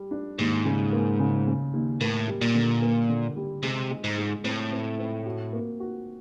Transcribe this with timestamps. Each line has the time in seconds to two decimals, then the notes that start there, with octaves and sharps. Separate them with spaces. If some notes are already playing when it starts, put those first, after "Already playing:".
Already playing: G3
0.11 D4
0.39 D#2 G#2
0.65 C#3
0.92 A#3
1.19 C#3
1.47 C#3
1.73 D#2
2.01 A2 A#3
2.28 G3
2.41 A#2
2.55 D3
2.82 A#3
3.09 D3
3.36 G3
3.63 C3 G#3
3.90 G#3
4.04 G#2
4.18 G#3
4.44 A2 C4
4.71 C4
4.98 C4
5.26 F#4
5.53 A#3
5.80 F#4